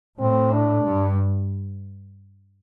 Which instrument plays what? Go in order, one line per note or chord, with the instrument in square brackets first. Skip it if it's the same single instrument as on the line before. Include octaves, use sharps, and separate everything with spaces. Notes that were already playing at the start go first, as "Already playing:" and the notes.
[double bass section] A2 [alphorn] C4
[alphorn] D4
[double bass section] G2